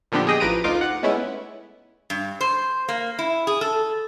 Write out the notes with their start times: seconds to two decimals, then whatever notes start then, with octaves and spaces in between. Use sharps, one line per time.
0.12 A#2 D3 F3 B3 D4 G4
0.27 G#4 D#5 G5
0.40 A1 F3 B4 A#5 D7 D#7
0.64 D2 D#4 F4 D6
0.81 F#5
1.03 G#3 A3 B3 C#4 E4
2.10 G2
2.41 C5
2.88 A#3
3.19 E4
3.47 G#4
3.61 A4